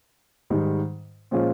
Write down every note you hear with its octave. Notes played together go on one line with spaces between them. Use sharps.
G#2 D#3 G3
A#2 F3 G#3 C#4 F4